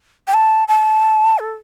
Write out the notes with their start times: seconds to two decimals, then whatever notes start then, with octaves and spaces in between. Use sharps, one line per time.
0.28 G5
0.34 A5
0.68 A5
1.39 A4